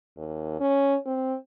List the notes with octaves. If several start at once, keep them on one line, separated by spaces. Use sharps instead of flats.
D#2
C#4
C4